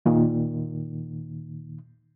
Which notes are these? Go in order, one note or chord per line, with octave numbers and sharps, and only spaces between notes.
D#2 A#2 D#3